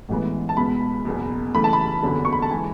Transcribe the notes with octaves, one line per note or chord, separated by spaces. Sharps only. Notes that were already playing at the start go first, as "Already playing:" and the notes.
A1 A2 E3 G#3 B3
A5
C#2 B2 G#3 B3 B5
F#1 E2 B2
D2 C#3 E3 A3 B5
A5
B5
F#1 E2 D3 F#3
C#6
B5
A5
E3 G#3 G#5